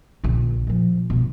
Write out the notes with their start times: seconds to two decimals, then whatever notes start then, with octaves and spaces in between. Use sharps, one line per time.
0.24 A#1 D3
0.67 A#2 F3
1.10 G2 B2